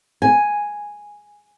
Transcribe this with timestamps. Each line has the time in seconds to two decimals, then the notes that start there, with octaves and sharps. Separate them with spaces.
0.22 G#5